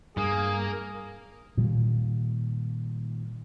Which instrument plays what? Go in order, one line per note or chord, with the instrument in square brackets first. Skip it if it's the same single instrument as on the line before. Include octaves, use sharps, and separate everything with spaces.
[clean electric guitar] G2 [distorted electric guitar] A#3 [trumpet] G#4
[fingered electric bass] A#2 D#3 G3